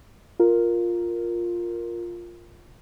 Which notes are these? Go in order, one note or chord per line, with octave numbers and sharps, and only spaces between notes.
F4 A#4